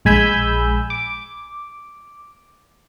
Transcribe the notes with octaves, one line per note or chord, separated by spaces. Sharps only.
A#1 G#3 G#5 B5 E6 G6
D6